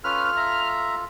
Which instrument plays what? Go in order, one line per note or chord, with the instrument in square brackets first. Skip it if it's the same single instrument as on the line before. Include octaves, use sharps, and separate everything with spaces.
[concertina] C#4 B4 [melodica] F4 A4 [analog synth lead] F6
[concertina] E5 A#5